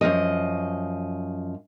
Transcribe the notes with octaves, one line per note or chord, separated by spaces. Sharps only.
F#2 B2 F3 D#5